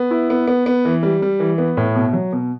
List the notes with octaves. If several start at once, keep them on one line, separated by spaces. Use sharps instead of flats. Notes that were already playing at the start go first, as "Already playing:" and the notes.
Already playing: B3
E4
B3
B3
B3
E3
G3
G3
E3
B3
A2
B2
F#3
B2